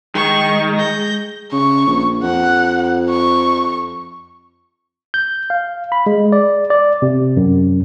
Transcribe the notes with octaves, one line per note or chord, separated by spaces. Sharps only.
D#3 G#3 C#6
G#3 G6 A#6
C#3 C#6
A#1
F2 F#5
C#6
G6
F5
B5
G#3
D5
D5
C3
F#2